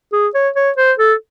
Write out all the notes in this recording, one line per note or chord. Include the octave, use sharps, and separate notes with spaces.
G#4
C#5
C#5
C5
A4